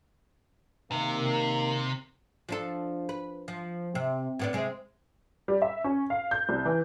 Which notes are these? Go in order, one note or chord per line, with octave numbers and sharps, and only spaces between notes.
C3 D#3 A#3
F3 D4 A4
B4
F3
C3
A2 B3 D4
C3 G#3 C4
G3
E5
C#4
F5
G6
C2
E3